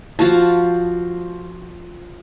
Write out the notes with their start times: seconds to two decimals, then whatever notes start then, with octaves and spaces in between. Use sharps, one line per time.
0.19 F3 F4 F#4 A5